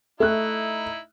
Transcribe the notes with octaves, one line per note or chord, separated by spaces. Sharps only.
A3 D#4 E4 F#6